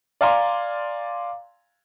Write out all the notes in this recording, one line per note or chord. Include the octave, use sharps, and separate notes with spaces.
D5 F5 G#5 A#5 C6 D6